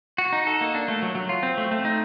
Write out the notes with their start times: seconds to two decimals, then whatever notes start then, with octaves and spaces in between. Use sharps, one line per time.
0.18 F#4
0.33 D#4
0.47 A4
0.61 A#3
0.75 D4
0.88 A3
1.02 F#3
1.15 F#3
1.29 F4
1.43 C4
1.58 A3
1.71 A3
1.85 D#4